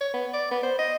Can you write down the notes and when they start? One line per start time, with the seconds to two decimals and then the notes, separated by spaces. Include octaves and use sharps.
0.01 C#5
0.14 B3
0.34 D5
0.51 B3
0.63 C5
0.79 D#5